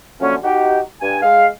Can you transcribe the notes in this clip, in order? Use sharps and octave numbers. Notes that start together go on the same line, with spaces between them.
D3 F3 F#3 A3 A#3 C#4
D#4 F#4 G4
G2 G#5
G#3 F5